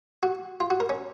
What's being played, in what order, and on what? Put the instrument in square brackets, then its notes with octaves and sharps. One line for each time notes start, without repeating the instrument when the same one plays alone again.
[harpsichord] F#4
F4
F#4
A#4
C#4